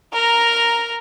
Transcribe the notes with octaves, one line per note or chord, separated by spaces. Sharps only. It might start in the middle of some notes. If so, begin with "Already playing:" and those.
A#4 A#5